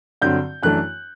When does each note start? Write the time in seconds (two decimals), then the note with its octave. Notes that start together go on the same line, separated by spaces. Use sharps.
0.22 G2 D3 F#3 C4 G6
0.63 F#2 E3 A3 D4 F#6